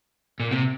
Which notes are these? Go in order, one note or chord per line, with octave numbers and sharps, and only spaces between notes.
A#2
C3